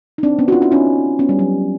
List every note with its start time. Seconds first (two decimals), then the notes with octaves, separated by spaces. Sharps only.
0.18 D#4
0.23 C4 D4
0.39 B3 C#4
0.48 F#4
0.52 D#4 F4
0.62 D4 E4
0.72 C#4 D#4
1.19 B3 C#4
1.29 G3
1.39 F#3